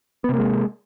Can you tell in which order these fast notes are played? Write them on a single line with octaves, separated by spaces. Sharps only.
B3 C3 A#3 G#3